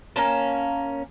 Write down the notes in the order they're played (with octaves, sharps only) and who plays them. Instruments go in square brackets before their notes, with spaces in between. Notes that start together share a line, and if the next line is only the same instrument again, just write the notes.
[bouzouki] A#3 C#4 A5